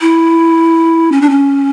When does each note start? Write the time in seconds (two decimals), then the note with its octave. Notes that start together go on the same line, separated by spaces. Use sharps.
0.01 E4
1.12 C#4
1.22 D4
1.30 C#4